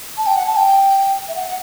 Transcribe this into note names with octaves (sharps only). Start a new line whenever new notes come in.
A5
G5
F#5
A5
G5
E5
F#5
F#5